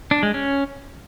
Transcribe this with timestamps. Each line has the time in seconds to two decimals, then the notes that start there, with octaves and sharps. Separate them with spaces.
0.11 D4
0.23 G#3
0.34 C#4